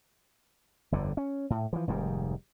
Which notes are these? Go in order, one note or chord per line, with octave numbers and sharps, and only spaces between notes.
G1 F2 D3
C#4
A2
E3 F3
F1 G#2 D#3 G3